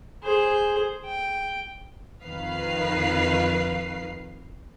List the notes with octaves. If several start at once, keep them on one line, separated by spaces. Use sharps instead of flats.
G#4 C5
G5
F2 D#3 B4 F5 C7